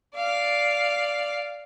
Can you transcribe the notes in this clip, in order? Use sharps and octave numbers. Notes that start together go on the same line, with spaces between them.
D5 F5